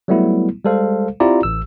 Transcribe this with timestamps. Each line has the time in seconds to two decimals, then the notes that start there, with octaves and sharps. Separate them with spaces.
0.08 F#3 G3 A3 B3 E4
0.65 G3 G#3 A4 C5 F5
1.20 C4 E4 F4 G4 D5 A#5
1.43 A1 E6